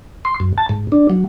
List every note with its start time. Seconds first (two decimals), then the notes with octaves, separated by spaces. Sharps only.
0.25 C6
0.40 F#2
0.58 A5
0.69 G#2
0.92 D4
1.10 F#3